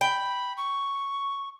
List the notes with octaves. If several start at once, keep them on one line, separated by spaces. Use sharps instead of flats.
G5 B5
C#6